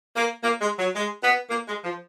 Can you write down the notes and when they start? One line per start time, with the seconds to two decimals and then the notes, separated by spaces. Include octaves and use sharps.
0.16 A#3
0.43 A#3
0.61 G#3
0.78 F#3
0.96 G#3
1.23 B3
1.49 A#3
1.67 G#3
1.84 F3